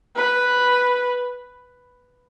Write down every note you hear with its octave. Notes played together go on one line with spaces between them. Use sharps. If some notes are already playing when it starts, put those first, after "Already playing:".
B4